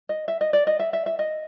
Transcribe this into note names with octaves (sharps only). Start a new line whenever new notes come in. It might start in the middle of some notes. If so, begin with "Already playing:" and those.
D#5
E5
D#5
D5
D#5
E5
E5
E5
D#5